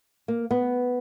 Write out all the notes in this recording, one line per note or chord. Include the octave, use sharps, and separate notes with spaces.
A#3
B3